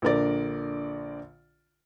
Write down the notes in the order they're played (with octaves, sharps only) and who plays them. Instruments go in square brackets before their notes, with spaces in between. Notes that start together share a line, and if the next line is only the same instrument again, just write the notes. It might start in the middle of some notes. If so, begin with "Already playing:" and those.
[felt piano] A#1 D3 A#4 D5